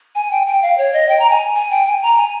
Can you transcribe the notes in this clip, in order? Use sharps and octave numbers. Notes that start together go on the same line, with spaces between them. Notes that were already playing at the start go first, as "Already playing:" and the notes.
G#5
G5
G5
F5
C#5
D#5
G5
A#5
G#5
G#5
G5
G#5
A#5
G#5